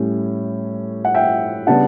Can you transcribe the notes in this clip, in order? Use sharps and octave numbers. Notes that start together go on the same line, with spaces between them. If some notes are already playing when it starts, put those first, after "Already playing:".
Already playing: A2 G3 C#4
F#5
E5 G5
C#3 G3 B3 D4 F#5 A5